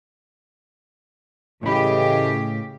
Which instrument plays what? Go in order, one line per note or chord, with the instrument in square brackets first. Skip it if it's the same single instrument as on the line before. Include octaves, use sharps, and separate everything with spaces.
[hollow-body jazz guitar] A2 B5 [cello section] C#3 G4 [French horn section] E3 A3 D#5